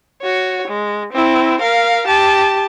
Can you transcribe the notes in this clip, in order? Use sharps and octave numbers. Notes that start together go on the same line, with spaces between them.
F#4 C#5
G#3
C4 E4
A#4 F5
G4 A5